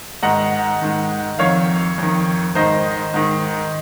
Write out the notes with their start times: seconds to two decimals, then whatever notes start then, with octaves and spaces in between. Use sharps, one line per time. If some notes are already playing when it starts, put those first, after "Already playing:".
0.23 G#2 D#3 D#5 F#5
0.81 G#2 D#3
1.39 F2 D#3 C#5 F5
1.98 F2 D#3
2.55 G#2 D#3 C5 D#5
3.14 G#2 D#3